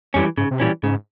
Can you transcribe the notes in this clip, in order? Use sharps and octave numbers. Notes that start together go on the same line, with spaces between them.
F2 E3 G3 C#4
G#2 C#3
C3
A#2 E3 G3 C#4
G#2 C#3